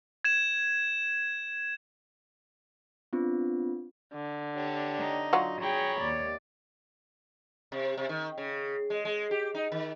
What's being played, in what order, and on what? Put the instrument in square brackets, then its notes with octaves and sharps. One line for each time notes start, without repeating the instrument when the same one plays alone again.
[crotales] G#6 E7
[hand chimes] B3 C4 D4 F4
[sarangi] D3
[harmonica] D4 G4 C#5
[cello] D#4
[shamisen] F#3 F4 F#4
[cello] G#4 G5 [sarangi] C#5 [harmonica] A#5 B5 C#6
[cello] D#2 D5
[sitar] C3
C3
D#3
C#3
G#3
G#3
G4
D#4
D#3